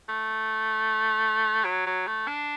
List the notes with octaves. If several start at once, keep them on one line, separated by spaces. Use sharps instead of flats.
A3
F#3
F#3
A3
D4